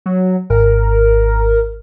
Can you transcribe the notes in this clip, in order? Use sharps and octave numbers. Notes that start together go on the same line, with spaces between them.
F#3
G#1 A#4